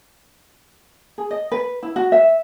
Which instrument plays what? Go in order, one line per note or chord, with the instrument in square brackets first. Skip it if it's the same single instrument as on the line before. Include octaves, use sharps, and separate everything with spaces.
[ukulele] G#4
D#5
B4
E4
F#4
E5